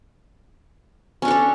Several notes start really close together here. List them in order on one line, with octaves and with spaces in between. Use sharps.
C#4 D4 A4 C#5